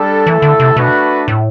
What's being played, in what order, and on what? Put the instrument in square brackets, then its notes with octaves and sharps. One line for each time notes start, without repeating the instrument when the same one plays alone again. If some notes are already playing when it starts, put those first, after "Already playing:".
Already playing: [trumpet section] G3 D4 A4
[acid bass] E3 [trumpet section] A3 E4 A4
[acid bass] D3
C3
[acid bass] B2 [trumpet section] A3 D4 F#4 B4
[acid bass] A2